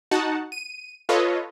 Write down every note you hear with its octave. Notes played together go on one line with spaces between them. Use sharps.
D#4 F#4 F#5 A5
D#7
F4 A4 B4 C#5 D#5